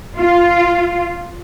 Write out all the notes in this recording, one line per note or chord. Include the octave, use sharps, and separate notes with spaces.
F4